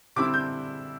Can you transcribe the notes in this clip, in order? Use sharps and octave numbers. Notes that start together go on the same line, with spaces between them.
D3 G3 C4 E4 D6
G6